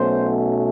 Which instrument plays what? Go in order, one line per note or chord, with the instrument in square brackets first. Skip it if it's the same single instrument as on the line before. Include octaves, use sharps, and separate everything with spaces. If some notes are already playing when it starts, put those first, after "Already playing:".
Already playing: [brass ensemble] B1 B2 F#3 A3 C#4 C5